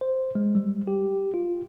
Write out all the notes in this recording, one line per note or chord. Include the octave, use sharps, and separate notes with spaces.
C5
G#3
G3
G4
F4